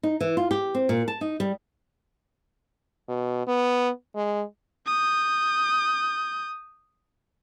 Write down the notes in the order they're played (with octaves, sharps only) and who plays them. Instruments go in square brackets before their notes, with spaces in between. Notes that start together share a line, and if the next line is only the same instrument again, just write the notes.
[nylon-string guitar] D#4
E3
F4
G4
C4
A#2
A5
D#4
G3
[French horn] B2
B3
G#3
[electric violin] D#6 G6